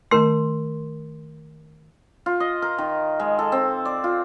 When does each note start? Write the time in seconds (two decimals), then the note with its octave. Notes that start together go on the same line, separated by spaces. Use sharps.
0.11 D#3 A3 A#4 C6
2.26 F4
2.40 D#5
2.62 A#4
2.78 D#3
3.20 G#3
3.39 A4
3.52 C4
3.85 D5
4.04 F4